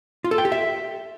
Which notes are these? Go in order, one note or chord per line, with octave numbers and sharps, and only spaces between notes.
F4
A4
G5
G4
E5